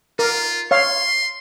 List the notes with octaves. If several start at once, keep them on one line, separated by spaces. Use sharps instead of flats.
F4 A#4
C#5 F5 C6